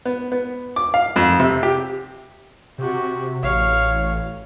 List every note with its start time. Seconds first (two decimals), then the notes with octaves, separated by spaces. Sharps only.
0.05 B3
0.32 B3
0.76 D6
0.94 F5
1.16 F2
1.40 C3
1.63 G4
2.78 C3 F#4 G4
3.43 A1 C#5 F5